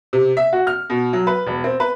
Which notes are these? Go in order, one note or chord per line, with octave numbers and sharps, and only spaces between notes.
C3
E5
F#4
F6
B2
F#3
B4
E1
C4
B4